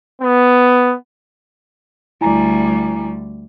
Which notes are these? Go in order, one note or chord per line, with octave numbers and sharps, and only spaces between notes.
B3
D2 G3 E4 G#5 A#5